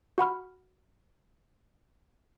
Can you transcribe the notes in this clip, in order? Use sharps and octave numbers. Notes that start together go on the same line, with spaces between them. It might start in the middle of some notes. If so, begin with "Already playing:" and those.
F#4 F#5 B5 F6